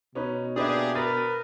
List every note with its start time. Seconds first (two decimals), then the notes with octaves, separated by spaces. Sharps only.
0.15 B2 C#4 D#4 B4
0.56 A#3 D4 G4 G#4 B4 E5
0.95 A#4 B4 A6